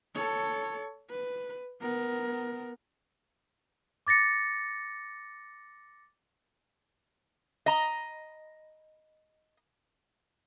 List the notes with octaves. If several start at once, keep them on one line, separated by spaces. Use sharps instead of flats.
A4 C#5
B4
B3 A#4
D6 A6 A#6 C#7
D#5 A#5